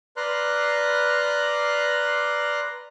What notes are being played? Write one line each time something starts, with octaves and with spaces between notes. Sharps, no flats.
B4 D5 A#5 C6 F6 F#6